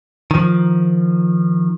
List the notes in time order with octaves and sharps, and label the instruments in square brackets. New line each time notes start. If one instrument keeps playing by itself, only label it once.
[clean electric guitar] D#3 F3